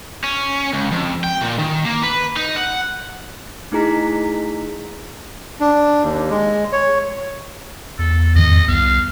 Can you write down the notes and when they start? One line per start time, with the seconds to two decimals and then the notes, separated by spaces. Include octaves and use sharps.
0.24 C#4
0.74 C#2
0.92 F2
1.24 G5
1.41 A#2
1.58 D#3
1.85 A#3
2.03 B4
2.37 D#4
2.56 F#5
3.72 A3 D#4 E4 G#4 A#5 B6
5.61 D4
6.03 D#2
6.30 G#3
6.72 C#5
7.99 E2 A4
8.36 F2 G#2 D#3 D#5
8.68 C2 B3 F5